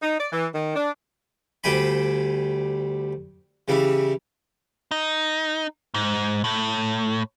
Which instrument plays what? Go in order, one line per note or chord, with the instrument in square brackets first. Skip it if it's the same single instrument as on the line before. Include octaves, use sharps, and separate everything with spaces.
[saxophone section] D#4
D5
E3
D#3
D4
[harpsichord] D2 G3 C5 G5 G#5 B5
C#3 E3 G3 E4
[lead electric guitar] D#4
G#2
A2